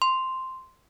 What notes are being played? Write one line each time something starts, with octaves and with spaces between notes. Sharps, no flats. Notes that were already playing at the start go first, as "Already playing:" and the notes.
C6